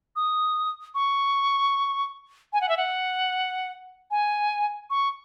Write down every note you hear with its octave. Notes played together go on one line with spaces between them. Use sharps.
D#6
C#6
G#5
F#5
E5
F#5
G#5
C#6